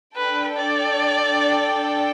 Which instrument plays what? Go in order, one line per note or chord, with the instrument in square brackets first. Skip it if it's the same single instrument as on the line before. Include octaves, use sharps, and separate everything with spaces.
[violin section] D4 A4 G5 [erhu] B4
[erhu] D5